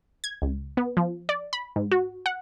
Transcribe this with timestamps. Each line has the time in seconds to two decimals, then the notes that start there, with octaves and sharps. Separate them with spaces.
0.24 G#6
0.42 C#2
0.77 B3
0.97 F3
1.29 D5
1.53 B5
1.76 G#2
1.91 F#4
2.26 F#5